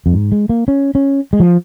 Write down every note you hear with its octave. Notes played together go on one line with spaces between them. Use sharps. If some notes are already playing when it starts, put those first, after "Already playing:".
F2
G#2
G#3
A#3
C#4
C#4
G#3
F3